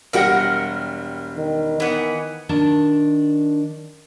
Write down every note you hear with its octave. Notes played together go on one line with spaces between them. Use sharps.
E1 G3 A#4 F#5 G5 A#6
D#3
D#3 E3 B3
D#3 D4 A5